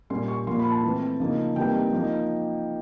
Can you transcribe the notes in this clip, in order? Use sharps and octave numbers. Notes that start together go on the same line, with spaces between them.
A#2 G3 A#3 C#4 C6
C#6
A#2 F3 A#3 C6
B5
A5
E3 A3 C4
C#3 F3 A#3 D#4
C3 E3 G3 A#3 D#4 G5
F3 A#3 D#4